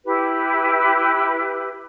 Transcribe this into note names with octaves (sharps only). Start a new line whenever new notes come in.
E4 G4 B4